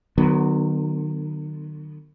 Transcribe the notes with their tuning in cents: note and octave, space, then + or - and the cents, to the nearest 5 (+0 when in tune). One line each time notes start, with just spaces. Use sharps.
D#3 -45 F#3 +10 B3 +0